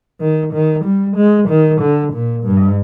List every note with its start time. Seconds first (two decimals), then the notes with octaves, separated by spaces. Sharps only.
0.21 D#3
0.54 D#3
0.85 G3
1.17 G#3
1.49 D#3
1.81 D3
2.13 A#2
2.44 G2